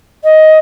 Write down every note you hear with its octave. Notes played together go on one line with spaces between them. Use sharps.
D#5